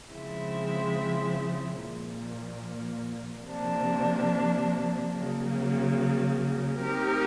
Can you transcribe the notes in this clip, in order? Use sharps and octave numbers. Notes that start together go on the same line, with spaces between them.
C#3 F3 G#3 C4 E4
A#2 F3 A#3
C3 F3 A#3 D4
C#3 F#3 A#3
A3 C4 D#4 G4 A#4